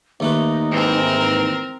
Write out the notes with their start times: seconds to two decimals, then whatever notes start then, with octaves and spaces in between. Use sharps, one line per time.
0.20 D#2 A3 D#4 B4
0.71 G#2 E3 C4 A#4